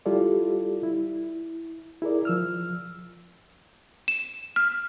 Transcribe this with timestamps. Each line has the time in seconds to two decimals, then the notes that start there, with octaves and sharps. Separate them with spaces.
0.06 G3 E4 F4 G4 A4 D5
0.83 E4
2.02 E4 G#4 A#4 D5
2.25 F3 E6 F6
4.08 E7
4.56 F6